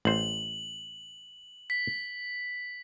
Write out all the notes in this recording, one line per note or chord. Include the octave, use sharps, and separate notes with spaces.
A1 C5 F#7
B6